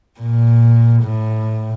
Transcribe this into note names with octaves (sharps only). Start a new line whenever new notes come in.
A#2
A2